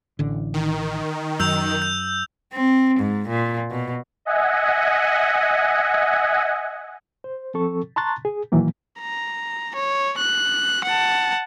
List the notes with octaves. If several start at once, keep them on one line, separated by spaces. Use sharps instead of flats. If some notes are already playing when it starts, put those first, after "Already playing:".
A1 D3
D#3
F#2 E6 G6 F7
G6
C4
G#2
A#2
B2
D#5 E5 F#5 G#5
C5
F3 C4 A4 C#6
A5 A#5 C6 C#6 F#6 A6
G#4
A#2 D#3 E3 F#3 A#3
A#5
C#5
F#6
F#5 A5